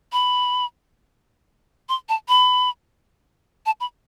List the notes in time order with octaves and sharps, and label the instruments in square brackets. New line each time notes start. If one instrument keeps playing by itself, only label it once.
[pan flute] B5
C6
A5
B5
A5
B5